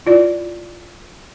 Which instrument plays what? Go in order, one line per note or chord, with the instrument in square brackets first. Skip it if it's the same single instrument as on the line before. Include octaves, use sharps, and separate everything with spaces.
[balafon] E4 F4 D5